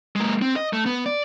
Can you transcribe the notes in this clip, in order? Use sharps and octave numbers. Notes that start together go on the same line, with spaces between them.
G#3 A#3
C4
D#5
A3
B3
D5